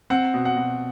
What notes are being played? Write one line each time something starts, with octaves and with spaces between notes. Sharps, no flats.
C4 F#5
B2
F#5
B2